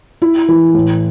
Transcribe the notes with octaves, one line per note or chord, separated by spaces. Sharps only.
E4
E3
A2